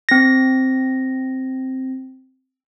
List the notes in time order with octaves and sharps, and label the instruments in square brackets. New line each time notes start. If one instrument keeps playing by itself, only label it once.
[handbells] C4 A#6